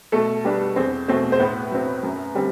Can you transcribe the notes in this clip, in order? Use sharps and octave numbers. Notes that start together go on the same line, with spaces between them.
B2 A3 A4
G3 B3 D4
E2 C4 C5
B2 A3 C4 C5
C5
A2 B3 B4
F#3 C4
F#2
D3 G3 C4